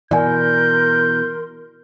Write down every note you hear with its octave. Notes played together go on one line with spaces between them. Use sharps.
B2 E3 A#4 D5 G#5 C6 G6